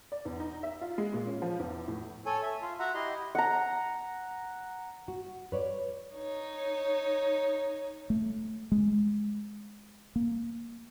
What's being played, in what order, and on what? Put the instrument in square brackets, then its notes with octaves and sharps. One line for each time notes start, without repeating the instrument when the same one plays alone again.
[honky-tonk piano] D5
E2
D#4
E5
F4
G#3
A#2
C#4
F3
E2
A2
[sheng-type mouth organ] A4 C#5 G#5
E5
F4
F#4 E5 F#5 A#5
E4 G4 D#5 C6
[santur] F#5 A#5
[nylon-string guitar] F#4
B4 C#5 D5
[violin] D#4 C#5
[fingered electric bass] A3
G#3
A#3